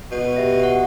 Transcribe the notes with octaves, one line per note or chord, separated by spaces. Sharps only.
B2
G4 E5 A#6
F#5